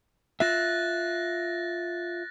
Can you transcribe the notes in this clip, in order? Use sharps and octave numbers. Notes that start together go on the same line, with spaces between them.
F4 E5 F#6 A6 A#6